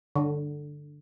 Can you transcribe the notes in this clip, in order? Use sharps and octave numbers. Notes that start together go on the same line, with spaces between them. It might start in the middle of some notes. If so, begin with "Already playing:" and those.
D3